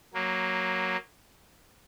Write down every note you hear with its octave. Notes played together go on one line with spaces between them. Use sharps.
F#3 A#3